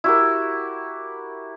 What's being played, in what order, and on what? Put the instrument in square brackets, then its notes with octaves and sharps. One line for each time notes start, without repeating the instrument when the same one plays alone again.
[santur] E4 F#4 G4 A#4